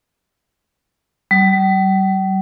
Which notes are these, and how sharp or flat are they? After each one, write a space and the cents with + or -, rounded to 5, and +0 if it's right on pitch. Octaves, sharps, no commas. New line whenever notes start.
G3 -40